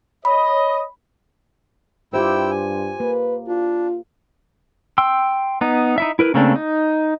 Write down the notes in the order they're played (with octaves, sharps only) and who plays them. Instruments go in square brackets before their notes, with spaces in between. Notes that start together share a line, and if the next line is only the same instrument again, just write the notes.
[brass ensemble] C#5 D#5 [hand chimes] B5
[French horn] G2 [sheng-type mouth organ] E4 G5 E6 [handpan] F4 G4 C5
[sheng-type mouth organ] G#5
[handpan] A#3 [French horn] B4
[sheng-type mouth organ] D4 [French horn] F4
[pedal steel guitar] G5 C6 E6
B3 D#4
D#4 E4 E5
E4 A#4 B4
C#3 A3 A#3 C4 D4
D#4